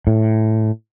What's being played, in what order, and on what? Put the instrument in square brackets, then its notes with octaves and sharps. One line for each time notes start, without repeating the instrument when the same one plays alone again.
[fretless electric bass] A2